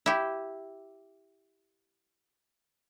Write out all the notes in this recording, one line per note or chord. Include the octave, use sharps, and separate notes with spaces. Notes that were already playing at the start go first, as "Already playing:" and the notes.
E4 G4